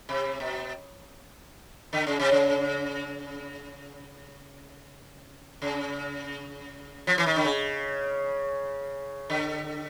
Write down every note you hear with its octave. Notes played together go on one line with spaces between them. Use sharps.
C3
B2
D3
C#3
C3
C#3
C#3
F3
E3
D#3
D3
C#3
D3